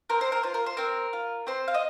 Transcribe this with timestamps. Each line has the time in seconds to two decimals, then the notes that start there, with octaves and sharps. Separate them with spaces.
0.10 C4 A#4
0.21 C5
0.32 A#4
0.43 F4 C5
0.54 A#4
0.66 C5
0.77 C4 A#4
1.13 F4
1.47 C4 C5
1.68 F5
1.74 D#5